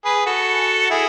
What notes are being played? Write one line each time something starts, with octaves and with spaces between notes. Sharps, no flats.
G#4 B4
F#4 A4
E4 G#4